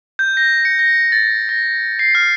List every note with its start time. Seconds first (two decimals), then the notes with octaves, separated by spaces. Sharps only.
0.19 G6
0.37 A#6
0.65 C#7
0.79 A#6
1.12 A6
1.49 A#6
1.99 C7
2.15 F6